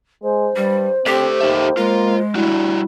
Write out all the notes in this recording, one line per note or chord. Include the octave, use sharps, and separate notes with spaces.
G#3 C5
G2 G3
A3 C4 G4 A4 D5
D#2 D#4 A4 E5
G#3 A#3 F4
G3 D4 E4 F#4